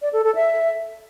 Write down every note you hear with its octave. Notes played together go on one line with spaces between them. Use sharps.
D5
A4
A4
E5